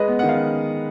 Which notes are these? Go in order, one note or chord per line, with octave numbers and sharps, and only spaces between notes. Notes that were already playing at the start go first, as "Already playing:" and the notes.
Already playing: G#3 B4 D#5
B3
D#3 F#5
F5